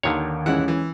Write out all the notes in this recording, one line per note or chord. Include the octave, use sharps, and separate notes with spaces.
D#2 D3 D#3 C#5
E3 G#3 C#4 E4 F#5
E3